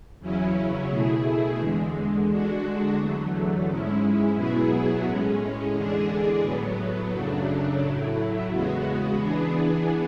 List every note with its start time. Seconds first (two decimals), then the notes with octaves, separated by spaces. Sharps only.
0.19 E2 C#3 F#3 C#4 E4
0.89 B2 A3 E4 G#4
1.58 E2 D3 G#3
2.27 D3 G#3 D4 F#4
2.96 E2 D3 F#3 A3
3.65 G#2 G#3 C#4 E4
4.35 B2 F#3 B3 E4 G#4
5.04 A2 G#3 C#4
5.72 E2 D3 G#3 D4 G#4
6.41 A2 F#3 B3
7.12 F#2 C#3 F#3 A3 D4
7.80 A2 F#3 A3 E4
8.50 E2 C#3 G#3 B3 F#4
9.18 E3 B3 D4 G#4